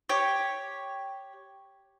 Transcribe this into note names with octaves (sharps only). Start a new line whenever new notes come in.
G4 C#5